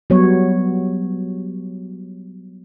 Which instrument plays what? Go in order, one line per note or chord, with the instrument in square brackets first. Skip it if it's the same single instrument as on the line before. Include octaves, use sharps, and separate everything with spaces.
[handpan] F#3 G3 B3 C#5